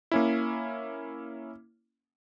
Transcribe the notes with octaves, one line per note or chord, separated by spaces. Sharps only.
A#3 C#4 E4